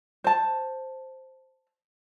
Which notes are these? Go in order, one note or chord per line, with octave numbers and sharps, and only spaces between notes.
C5 A5